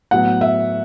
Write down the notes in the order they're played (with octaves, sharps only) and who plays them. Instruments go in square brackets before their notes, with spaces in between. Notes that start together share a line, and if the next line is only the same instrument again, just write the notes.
[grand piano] A2 F#3 B3 [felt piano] F#5
[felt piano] E5